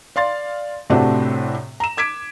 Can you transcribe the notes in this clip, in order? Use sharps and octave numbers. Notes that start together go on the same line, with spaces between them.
D5 F5 C6 A6
A2 C3 A3 C4 D4 F#4
A#5 E7
D6 G#6 B6 D7